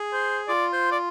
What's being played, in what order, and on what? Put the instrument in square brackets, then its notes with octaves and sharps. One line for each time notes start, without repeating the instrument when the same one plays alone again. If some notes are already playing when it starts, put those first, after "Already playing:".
Already playing: [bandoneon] G#4
[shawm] C5
[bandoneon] F4 [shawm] D5
[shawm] C5
D5